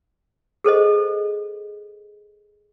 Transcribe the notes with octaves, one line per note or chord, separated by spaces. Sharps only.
G#4 A4 C5 D#5